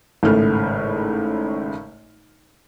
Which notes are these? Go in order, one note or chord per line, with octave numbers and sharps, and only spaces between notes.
G#1 A2 C#3 A3 F6